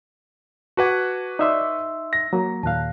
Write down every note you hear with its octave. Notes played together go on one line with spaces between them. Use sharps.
F#4 B4 F#5 A5 D6 G#6
D#4 D5 E5 C6 D6 E6
E6
A#6
F#3 A#3 A#5
D#2 A#2 F5 A5 F#6